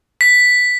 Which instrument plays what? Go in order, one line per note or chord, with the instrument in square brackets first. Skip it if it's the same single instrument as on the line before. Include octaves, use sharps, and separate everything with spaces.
[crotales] B6